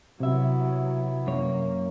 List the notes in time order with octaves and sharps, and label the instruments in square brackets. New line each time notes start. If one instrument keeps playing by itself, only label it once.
[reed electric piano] C3 E5 [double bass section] F#3 [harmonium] B3 E4
[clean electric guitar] F#2 C#5 [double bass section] A#3